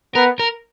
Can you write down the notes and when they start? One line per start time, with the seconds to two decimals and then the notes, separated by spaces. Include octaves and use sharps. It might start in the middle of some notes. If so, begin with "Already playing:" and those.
0.15 B3 A#4
0.39 A#4